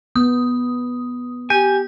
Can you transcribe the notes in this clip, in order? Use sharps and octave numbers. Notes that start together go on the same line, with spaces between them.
B3 D#6
G4 G#5 G6